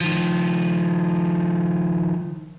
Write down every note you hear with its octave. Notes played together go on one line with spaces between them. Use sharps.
D#3 F3